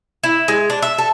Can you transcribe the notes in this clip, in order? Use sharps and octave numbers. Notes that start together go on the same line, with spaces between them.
E4
G#3
D4
E5
A4